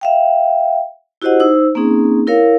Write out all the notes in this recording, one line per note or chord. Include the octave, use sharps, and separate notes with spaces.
E5 F5 G5
E4 F#4 G4 C5 D#5 F#5
D#4 C5 E6
A#3 C4 C#4 D#4 G#4
E4 A#4 C#5 F5